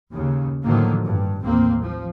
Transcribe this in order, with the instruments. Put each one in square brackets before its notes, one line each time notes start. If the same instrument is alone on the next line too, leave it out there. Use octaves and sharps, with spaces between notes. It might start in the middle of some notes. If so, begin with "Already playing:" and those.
[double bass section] D#2 C#3
A2 D3 D#3 F3 F#3 A#3
G2
A1 D#2 A#3 C4
F3